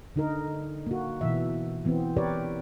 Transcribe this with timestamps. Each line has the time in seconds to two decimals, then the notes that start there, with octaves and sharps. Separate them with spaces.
0.16 D3 D#4 A#4
0.87 A#3 F#4
1.21 B2 E3 E5
1.85 E3 B3 C4
2.16 G4 A#4 B4 C#5 D5